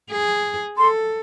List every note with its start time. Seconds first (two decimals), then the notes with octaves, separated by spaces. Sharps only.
0.11 G#4
0.78 A4 C6